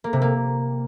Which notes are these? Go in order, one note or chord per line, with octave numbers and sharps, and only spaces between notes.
A#3
C3
A#3